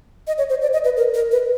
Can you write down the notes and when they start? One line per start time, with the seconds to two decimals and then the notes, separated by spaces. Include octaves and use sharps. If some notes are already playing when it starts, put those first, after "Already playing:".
0.27 D#5
0.38 C#5
0.50 C5
0.62 D5
0.73 D#5
0.84 B4
0.97 A#4
1.14 A#4
1.31 B4